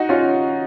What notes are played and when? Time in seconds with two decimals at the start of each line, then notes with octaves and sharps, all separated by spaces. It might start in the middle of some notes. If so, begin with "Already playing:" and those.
Already playing: D#4 F#4
0.09 C#4 F4